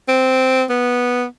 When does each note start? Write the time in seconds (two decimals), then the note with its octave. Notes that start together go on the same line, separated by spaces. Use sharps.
0.08 C4
0.69 B3